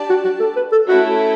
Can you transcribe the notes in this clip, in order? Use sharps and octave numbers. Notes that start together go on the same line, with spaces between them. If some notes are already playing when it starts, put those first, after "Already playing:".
Already playing: D4 G4 D5 A5
F#4
F#4
A4
B4
A4
A3 C#4 E4 F#4 A4